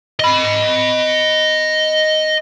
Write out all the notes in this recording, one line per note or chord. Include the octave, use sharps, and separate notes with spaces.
D#5 B5